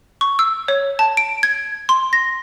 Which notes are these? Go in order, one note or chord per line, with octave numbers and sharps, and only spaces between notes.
C#6
E6
C#5
A5
D7
G#6
C6
A#6